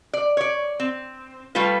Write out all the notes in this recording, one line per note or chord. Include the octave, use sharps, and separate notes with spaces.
D5
C#5 D5
C4
G3 A3 F4 B4